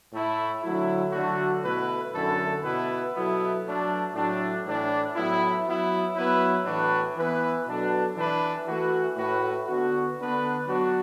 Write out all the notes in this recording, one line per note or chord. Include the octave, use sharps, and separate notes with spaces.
A2 A3 E4
D3 F#3 A3 E4
D3 F#3 A3 F#4
B2 A3 E4 B4
F#2 D3 A3 E4 A4
B2 B3 E4 B4
B2 F#3 B3 E4 A4
F#3 A3 D4
A2 F#3 A3 D4
A2 E3 D4
A2 F#3 B3 E4
F#3 B3 E4
F#3 B3 E4 B4
A2 E3 D4 F#4 B4
E3 B3 E4 B4
B2 F#3 D4 A4
E3 D4 B4
E3 A3 F#4
A2 A3 F#4 B4
D3 B3 F#4
D3 B3 D4 B4
F#3 B3 D4 F#4